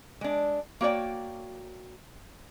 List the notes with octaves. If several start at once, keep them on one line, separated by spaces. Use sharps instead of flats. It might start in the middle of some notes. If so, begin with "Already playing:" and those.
G#3 D4
A#3 F#4 C#5 D5 G5